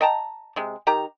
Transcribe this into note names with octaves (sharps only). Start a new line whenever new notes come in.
D#5 G5 A5 A#5
C3 G#3
D#3 G4 A#5